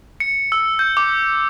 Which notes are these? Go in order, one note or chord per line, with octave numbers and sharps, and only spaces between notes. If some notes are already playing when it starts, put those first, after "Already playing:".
C#7
E6
G6
D6